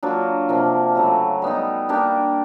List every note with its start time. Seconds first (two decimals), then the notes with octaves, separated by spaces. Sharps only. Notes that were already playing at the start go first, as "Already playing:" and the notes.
0.03 F#3 A#3 D4 F4
0.49 C3 F3 A#3 D4
0.95 C#3 F#3 A3
1.42 G3 B3 D#4
1.89 A#3 D4 G4